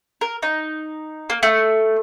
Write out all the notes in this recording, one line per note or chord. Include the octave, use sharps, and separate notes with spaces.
A#4
D#4
A#3
A3